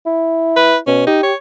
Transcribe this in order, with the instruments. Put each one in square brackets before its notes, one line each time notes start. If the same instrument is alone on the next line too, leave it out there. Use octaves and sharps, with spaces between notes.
[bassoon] E4
[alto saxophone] B4
[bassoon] B2 [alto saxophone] C#4
[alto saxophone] D#4 [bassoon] G4
[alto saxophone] C#5